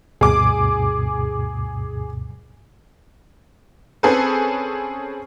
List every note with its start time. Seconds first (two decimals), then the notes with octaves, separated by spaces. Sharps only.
0.21 D2 G2 B2 G#4 D6
4.03 C4 C#4 G#4 A4 B4